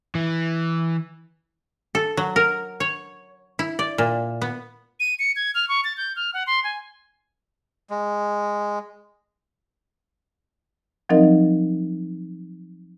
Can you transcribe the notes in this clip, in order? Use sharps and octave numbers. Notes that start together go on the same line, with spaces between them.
E3
A4
F#3
A#4
C#5
E4
D5
A#2
B3
D#7
C#7
G#6
F6
C#6
A6
G6
F6
F#5
C6
G#5
G#3
F3 F#3 C4 D#4 A#4 D#5